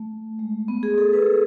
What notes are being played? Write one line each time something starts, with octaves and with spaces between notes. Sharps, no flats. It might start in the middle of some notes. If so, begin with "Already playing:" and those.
Already playing: A3
G#3
B3
G#4
A4
B4